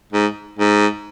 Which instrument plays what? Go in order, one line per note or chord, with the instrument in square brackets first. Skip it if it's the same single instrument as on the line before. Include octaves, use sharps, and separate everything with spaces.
[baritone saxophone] G#2
G#2